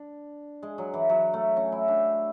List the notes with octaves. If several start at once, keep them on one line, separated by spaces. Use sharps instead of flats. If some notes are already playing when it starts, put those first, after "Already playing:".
Already playing: D4
G#3
F#3
E3
F#3
A3
C#4
E4
D4